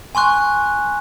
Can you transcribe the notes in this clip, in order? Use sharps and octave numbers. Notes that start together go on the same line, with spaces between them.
G#5 C6 C#6 F#6